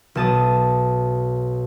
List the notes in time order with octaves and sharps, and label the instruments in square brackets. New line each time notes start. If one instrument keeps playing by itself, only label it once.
[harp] B1 A5 D#6